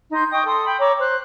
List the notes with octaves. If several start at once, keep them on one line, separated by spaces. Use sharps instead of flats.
D#4 C6 G6
D#5 G5 C#6 D#6
A4 C6 D#6
G5 B5
C#5 A#5 D6 E6
C5 F#6